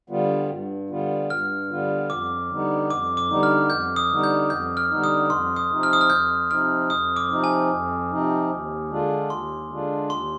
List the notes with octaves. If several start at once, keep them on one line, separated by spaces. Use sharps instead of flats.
D3 G3 B3 F4
G2
D3 G3 B3 F4
G2 F6
D3 G3 B3 F4
F2 D6
D3 G3 B3 D#4
F2 D6
D6
D3 G3 B3 D#4
F6
F2 G6
D#6
D3 G3 B3 D#4
G6
F2 G6
F6
D3 G3 B3 D#4
D#6
F2 C6
D#6
C3 F3 C4 D#4
F6
D#6
F6
F2 G6
C3 F3 C4 D#4 F6
F2 D#6
D6
C3 F3 C4 D#4
G#5
F2
C3 F3 C4 D#4
D#2
D3 G#3 D4 F4
D#2 C6
D3 G#3 D4 F4
D#2 C6